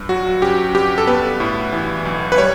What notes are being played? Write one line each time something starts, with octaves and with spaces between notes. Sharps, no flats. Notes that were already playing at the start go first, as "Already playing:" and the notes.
Already playing: G2
F#3 F#4
C#4 G4
G2 G4
A4
B3 B4
A2
E3
B1
B4
G3 C#5